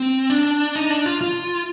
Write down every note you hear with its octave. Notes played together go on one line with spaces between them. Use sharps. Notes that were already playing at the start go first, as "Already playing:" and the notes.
Already playing: C4
D4
D#4
D4
F4
F4